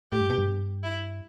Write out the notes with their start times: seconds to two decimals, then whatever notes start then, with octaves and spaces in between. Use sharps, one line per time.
0.12 A2 G4
0.21 G2
0.30 B2
0.38 G2
0.83 E4